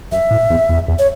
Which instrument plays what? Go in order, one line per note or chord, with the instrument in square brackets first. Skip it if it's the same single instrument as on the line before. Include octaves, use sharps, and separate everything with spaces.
[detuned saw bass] F#2 [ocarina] E5
[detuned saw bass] A2
E2
E2
E2
[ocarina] C#5